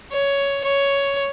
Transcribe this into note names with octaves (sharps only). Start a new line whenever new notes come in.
C#5
C#5